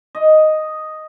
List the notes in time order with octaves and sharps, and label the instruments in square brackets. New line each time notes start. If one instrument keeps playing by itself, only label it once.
[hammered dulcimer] D#5